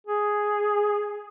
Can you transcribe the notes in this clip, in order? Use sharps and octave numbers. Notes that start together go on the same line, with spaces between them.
G#4